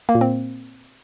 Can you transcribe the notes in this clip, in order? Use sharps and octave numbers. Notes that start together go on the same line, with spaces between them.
A#3
A#2
C4